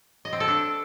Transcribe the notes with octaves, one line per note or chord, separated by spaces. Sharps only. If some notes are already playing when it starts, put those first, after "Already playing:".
D#5
C4
A4
D4